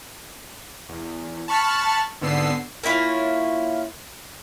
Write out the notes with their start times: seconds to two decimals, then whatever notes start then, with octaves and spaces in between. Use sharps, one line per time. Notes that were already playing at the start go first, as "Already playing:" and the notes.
0.89 E2
1.48 A5 B5 C#6 F6 F#6 A6
2.21 G#1 D3 B3 E6 C7
2.84 A#3 C#4 E4 F4